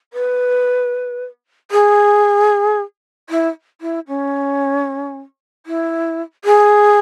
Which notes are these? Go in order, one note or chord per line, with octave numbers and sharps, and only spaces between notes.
B4
G#4
E4
E4
C#4
E4
G#4